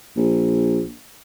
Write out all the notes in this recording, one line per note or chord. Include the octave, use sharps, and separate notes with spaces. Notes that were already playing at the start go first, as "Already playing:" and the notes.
A#1